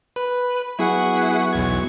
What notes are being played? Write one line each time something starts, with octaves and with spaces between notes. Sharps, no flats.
B4
F#3 B3 E4 G#4 F#5 C#6
B1 E2 G#6